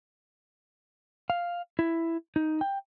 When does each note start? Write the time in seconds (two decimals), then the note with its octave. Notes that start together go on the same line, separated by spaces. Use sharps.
1.30 F5
1.79 E4
2.36 D#4
2.61 G5